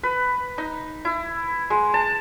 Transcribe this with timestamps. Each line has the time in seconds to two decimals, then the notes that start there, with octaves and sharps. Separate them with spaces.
0.03 B4
0.58 D#4
1.05 E4
1.70 G#3
1.94 A5